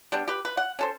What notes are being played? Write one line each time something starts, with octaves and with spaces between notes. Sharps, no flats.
G3 B3 D4
G4 B4
B4
F#5
C#4 A4 C5